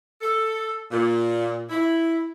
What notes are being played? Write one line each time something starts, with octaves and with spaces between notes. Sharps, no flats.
A4
A#2
E4